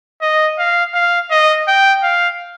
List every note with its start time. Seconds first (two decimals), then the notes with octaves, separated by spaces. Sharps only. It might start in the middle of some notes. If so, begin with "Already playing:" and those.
0.22 D#5
0.59 F5
0.94 F5
1.31 D#5
1.68 G5
2.03 F5